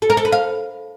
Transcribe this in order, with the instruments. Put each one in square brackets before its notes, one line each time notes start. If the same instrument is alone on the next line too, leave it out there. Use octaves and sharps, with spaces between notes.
[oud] A4
A#4
A4
B4
F5